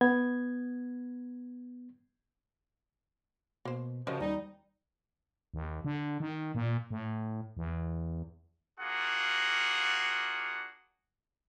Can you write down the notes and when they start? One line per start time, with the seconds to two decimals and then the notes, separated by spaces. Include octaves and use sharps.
0.01 B3 G#6
3.65 B2 A#3 C5
4.07 C#3 F3 C#4 F#4 G4 A#4 C5 D#5
4.20 D#2 G3 D#4
5.54 D#2
5.84 D3
6.20 D#3
6.55 A#2
6.90 A2
7.57 E2
8.80 A#3 D4 F4 F#4 G#4 F#5